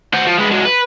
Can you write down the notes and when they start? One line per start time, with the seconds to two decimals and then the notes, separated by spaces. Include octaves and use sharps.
0.14 F#4 C5
0.27 F3
0.38 G#3 B3
0.51 F#3 G#3
0.65 B4